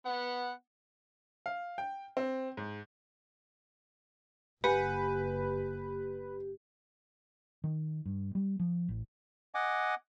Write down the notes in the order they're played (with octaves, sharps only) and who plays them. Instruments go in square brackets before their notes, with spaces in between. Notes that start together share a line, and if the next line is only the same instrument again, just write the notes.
[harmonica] B3 F#5
[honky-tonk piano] F5
G5
C4
G#2
[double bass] F#1 [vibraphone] G4 [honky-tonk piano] B4 [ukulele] F#5 G#5
[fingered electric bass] D#3
G2
G3
F3
A1
[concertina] D#5 F#5 G#5 D6